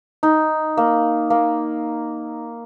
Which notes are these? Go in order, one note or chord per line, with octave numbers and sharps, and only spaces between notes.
D#4
A#3
A#3